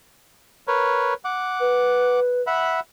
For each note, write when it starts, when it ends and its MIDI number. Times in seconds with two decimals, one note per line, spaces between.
0.68 1.14 70
0.68 1.14 71
0.68 1.14 73
1.25 2.20 78
1.25 2.20 86
1.60 2.42 71
2.47 2.80 76
2.47 2.80 78
2.47 2.80 83